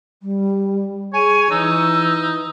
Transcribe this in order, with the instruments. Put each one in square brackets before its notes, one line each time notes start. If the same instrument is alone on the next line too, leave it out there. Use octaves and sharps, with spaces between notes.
[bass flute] G3
[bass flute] G#4 [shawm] C#5 [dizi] G#5
[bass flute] E3 [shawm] D#4 [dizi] E6